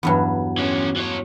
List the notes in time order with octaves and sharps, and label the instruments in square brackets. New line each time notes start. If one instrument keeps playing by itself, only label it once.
[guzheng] E2 G2 F#3
[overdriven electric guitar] E3 C#4
E3 C#5